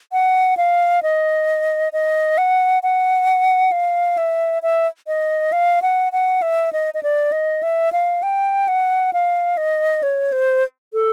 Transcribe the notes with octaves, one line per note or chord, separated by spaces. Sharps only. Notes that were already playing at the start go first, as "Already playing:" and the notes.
F#5
F5
D#5
D#5
F#5
F#5
F5
E5
E5
D#5
F5
F#5
F#5
E5
D#5
D#5
D5
D#5
E5
F5
G5
F#5
F5
D#5
C#5
C5
A4